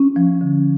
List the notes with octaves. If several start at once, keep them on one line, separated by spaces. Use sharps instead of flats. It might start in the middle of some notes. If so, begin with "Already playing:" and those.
Already playing: C#4
F3
D3